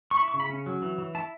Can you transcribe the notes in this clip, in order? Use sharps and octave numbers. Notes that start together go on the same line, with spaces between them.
C#6
E4 B5
C#6
C#3
B5
C#4
F#3
E3
E3
E4 A5